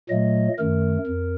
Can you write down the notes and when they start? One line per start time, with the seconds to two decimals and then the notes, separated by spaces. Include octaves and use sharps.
0.09 A#2 F#3 A3 D#5
0.58 F#2 D#3 A3 A#4
1.07 F2